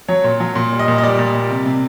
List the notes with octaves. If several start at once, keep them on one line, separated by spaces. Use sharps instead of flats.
F#3 C#5
A#2
F#3
A#2
G3
D#5
A#2
D#5
G3 D5
A#2
G3
C3
C3